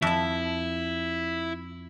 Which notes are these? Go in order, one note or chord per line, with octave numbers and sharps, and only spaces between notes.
F2 E4 A5